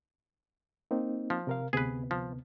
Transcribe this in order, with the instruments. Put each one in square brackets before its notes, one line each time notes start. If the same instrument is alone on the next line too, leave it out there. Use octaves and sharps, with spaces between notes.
[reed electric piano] A#3 C4 D#4
[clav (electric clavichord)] F3
[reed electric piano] C3 A#4 F5
[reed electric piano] D2 C3 B3 [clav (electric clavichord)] G#4 B4
[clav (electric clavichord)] F3